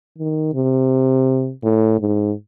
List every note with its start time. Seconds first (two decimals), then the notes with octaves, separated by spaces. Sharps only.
0.18 D#3
0.54 C3
1.63 A2
2.00 G#2